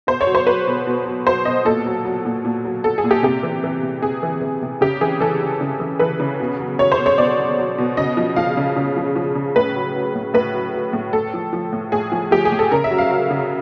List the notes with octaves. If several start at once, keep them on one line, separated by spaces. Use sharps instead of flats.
B2 C5
C#5
F#3
C5
F#3 B4
B2
B2
F#3
F#3 C5
B2 D#5
A#2 A4
F#3
F#3
A#2
A#2
F#3
F#3 A4
G#4
A#2
G4
C3 G4
E3
E3
C3
C3 G#4
E3
E3
C3
C#3 G4
E3 G#4
E3 A4
C#3
C#3
E3
E3 B4
C#3
B2
F#3
F#3 C#5
C5
B2
C#5
B2 D5
F#3
F#3
B2
C#3 D#5
F3
F3 F5
C#3
C#3
F3
F3
C#3
A2 B4
F#3
F#3
A2
A2 B4
F#3
F#3
A2
A2 A4
F3
F3
A2
A2 G#4
F3
F3 G4
G#4
A2
A4
C#3 A#4
E5
F#3
F5
F#3
C#3